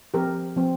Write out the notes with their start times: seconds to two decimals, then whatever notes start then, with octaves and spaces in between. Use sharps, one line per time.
0.14 F3 C4 G4 A#4
0.56 F3 C4